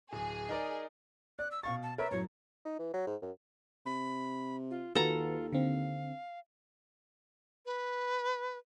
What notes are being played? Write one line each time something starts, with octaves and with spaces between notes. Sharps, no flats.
D1 G#4
D#4 A#4 D5
D5 F#6
E6
B2 F5 C#6 A6
A5
A#4 B4 C#5 E5
F#2 A2 F#3 C#5
D#4
E3
F#3
G#2
F#2
C3 B5
F4
D#2 D#3 F4 F#4 A4 B4 A#5
D3 C4 F5
B4